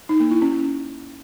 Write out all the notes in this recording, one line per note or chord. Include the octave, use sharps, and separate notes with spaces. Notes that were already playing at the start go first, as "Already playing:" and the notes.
D#4
A#3
E4
C#4